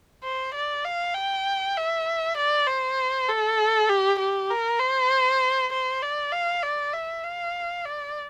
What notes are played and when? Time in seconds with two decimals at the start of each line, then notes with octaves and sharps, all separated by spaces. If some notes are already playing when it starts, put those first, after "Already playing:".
0.24 C5
0.54 D5
0.85 F5
1.15 G5
1.77 E5
2.37 D5
2.67 C5
3.29 A4
3.89 G4
4.19 G4
4.50 A#4
4.80 C5
5.73 C5
6.02 D5
6.32 F5
6.63 D5
6.93 E5
7.24 F5
7.85 D5